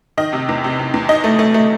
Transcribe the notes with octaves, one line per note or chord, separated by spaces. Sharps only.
D#3 D#5
C3
E2
C3
C3
E2
D#4 D#5
A3
A3
A3